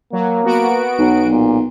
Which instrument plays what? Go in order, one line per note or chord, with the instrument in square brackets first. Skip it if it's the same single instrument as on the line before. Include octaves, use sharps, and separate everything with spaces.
[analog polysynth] F#3 [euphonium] A#3
[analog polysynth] B3 F#4 D7
[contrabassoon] B1 [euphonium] F#3
[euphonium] A#2